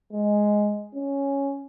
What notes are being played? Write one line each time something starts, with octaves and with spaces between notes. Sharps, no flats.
G#3
C#4